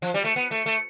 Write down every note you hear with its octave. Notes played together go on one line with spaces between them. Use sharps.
F3
G3
A3
B3
A3
A3